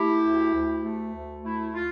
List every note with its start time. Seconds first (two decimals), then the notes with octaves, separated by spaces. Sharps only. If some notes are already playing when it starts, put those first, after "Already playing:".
Already playing: A3 E4 G4
0.24 D2
0.53 D2
0.84 A3
1.14 D2
1.44 A3 E4
1.75 F4